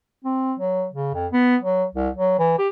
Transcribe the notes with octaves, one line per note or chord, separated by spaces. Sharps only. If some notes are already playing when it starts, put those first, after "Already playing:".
C4
F#3
C#3
F2
B3
F#3
C2
F#3
E3
G4